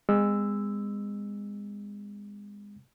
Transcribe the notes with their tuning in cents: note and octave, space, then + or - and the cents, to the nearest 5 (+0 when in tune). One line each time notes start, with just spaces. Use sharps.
G#3 -25 B3 +45 E6 +0